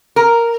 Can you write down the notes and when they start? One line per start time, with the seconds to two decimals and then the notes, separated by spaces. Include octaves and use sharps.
0.16 A#4